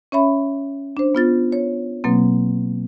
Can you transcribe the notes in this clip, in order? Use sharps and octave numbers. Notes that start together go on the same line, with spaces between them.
C#4 C#5 E5 B5
D4 C5
B3 F4 A6
C#5
B2 F#3 A#3 C4